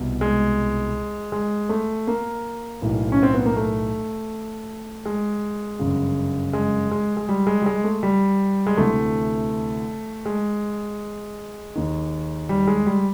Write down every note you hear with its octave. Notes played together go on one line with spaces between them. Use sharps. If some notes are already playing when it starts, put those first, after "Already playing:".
Already playing: C2 B2
G#3
G#3
A3
A#3
B1 A2 E3
C#4
C4
B3
A#3
A3
G#3
G1 F#2 C#3
G#3
G#3
G#3
G3
G#3
G3
G#3
A3
G3
G#3
D2 C3 E3 A3
G#3
D#2 D#3
G3
G#3
G3